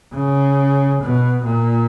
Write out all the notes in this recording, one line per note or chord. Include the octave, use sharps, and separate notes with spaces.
C#3
B2
A#2